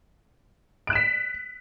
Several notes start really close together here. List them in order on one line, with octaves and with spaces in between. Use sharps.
D7 F#6 E7 B6